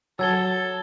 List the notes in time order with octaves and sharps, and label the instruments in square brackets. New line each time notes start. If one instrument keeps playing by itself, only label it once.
[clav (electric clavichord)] F#3 [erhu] A4 [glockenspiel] E6 G#6 G7